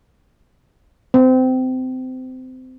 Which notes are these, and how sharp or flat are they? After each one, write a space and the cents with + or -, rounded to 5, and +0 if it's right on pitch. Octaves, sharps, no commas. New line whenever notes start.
C4 -25